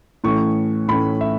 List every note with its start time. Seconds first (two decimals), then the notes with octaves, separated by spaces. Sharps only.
0.24 A2 E3 A3 C#4 C#6
0.88 A2 E3 A3 C#4 B5
1.21 E5